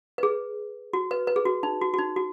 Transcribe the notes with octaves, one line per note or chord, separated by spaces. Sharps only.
B4
G#4
F#4
B4
B4
G#4
F#4
D#4
F#4
F#4
D#4
F#4